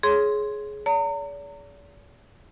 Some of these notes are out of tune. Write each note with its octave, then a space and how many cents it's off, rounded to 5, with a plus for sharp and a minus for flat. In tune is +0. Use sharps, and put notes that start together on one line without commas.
G#4 +15 C#5 +0 C6 +0
D5 -45 A#5 -35